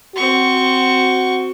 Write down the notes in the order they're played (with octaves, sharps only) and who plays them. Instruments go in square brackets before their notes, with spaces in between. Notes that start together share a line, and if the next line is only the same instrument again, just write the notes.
[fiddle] C4 C#6 [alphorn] F#4